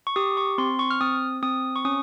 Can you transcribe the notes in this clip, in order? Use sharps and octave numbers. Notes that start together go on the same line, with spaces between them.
C#6
G4 D#6
C#6
C4 C6
C#6
F6
C4 D#6
C4 D#6
C#6
C#4 D#6